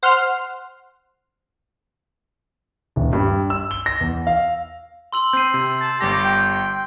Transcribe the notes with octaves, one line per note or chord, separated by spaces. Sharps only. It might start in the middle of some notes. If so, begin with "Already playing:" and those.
C5 F#5 C6 F6
D#1
G2
E6
G7
A#6
E2
F5
C6 E6 F#7
C4 G6 C7 D#7
C3
A5
G1 G3 G4 A#6
G5